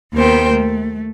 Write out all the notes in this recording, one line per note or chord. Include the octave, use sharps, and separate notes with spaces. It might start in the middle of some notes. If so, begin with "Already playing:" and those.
D#2 B3 A#4 C5 G5
A3